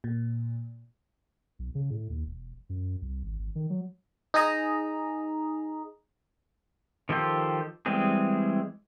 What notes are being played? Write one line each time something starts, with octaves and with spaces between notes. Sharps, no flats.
A#2
B1
C#3
A2
D#2
E1
F#2
C2
G#1
G#1
D#3
F#3
D#4 G#4 D#5 A#5
D#3 F3 G4 A4 C5
E3 G3 G#3 C4 G#4